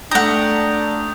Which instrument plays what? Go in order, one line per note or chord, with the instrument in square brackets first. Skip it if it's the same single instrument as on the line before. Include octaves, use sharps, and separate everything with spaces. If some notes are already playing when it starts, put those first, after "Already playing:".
[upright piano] A3 G5 [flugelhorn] D4 [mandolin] F#5 A#5 [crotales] D#6 G6